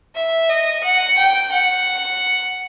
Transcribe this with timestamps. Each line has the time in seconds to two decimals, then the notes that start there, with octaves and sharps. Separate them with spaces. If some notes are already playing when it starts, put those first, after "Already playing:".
0.16 E5
0.49 D#5
0.83 F#5
1.18 G5
1.52 F#5